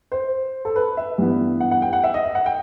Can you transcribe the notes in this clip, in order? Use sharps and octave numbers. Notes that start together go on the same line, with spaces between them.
C5
A4
B4
E5
G2 E3 B3
F#5
F#5
G5
F#5
E5
D#5
E5
F#5
G5